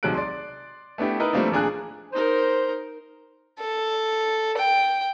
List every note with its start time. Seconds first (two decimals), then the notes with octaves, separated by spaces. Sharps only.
0.03 B1 C3 F#3 G#3 F#6 D7
0.14 D5 C6
0.98 A3 B3 D4 E4 G4
1.20 D#4 E4 A#4 B4
1.33 F3 G3 A3 A#3 C4 D4
1.52 A#1 A#2 D4 G#4 A#5 F#6
2.13 D#4 A#4 C5
3.60 A4
4.57 G5